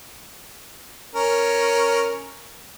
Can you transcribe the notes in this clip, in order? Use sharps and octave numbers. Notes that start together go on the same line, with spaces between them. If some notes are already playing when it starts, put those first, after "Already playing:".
C#4 A#4